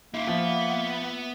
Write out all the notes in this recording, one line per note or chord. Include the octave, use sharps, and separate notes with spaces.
A#3 D#4 F4 E5
F3 B3 F#5